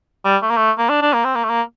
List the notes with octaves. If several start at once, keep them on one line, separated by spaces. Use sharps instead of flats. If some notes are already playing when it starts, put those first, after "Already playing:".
G3
A3
A#3
A3
A#3
D4
D4
A#3
C4
A#3
A3
A#3